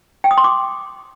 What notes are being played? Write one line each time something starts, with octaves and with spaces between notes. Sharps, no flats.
G5
D#6
C6
D6